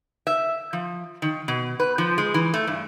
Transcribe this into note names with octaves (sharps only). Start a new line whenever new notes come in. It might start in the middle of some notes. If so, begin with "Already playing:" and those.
E5
F3
D#3
B2
B4
F3
G#3
E3
A3
G2